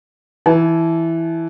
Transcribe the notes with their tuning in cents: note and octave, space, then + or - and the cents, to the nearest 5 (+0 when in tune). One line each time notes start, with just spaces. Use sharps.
E3 +0 A5 -30